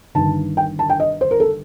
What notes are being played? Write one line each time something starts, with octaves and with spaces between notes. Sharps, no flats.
G1 G2 D#3 A5
G5
A5
G5
D#5
C5
A#4
A4